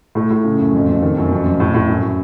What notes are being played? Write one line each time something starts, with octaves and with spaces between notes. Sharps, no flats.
A2 A3
A2
C#3
F#2
F2
F2
D#3
F#2
F2
F2
A2
A2
F#2